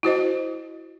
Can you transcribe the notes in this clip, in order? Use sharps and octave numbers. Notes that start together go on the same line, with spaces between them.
E4 F#4 C5 D#5